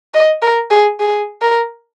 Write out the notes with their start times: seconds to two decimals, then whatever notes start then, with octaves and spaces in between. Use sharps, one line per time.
0.14 D#5
0.42 A#4
0.71 G#4
1.00 G#4
1.42 A#4